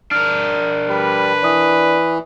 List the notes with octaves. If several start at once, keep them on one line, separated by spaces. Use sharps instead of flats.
D4 A#4 F6
G3 B4
E3 D5 D#6